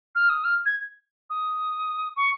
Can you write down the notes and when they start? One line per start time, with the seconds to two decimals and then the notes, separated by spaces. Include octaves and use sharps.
0.15 F6
0.29 D#6
0.44 F6
0.65 G#6
1.30 D#6
2.16 C#6